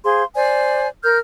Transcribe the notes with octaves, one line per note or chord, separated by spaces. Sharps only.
G#4 C5 F5 C6
C5 D5 G#5
A#4 F6 G6